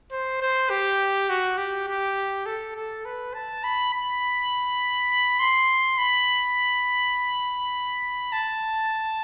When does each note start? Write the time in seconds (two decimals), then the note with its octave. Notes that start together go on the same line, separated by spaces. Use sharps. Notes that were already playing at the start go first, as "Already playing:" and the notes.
0.12 C5
0.41 C5
0.70 G4
1.29 F#4
1.58 G4
1.88 G4
2.46 A4
2.76 A4
3.05 B4
3.34 A5
3.64 B5
3.93 B5
5.39 C6
5.98 B5
8.32 A5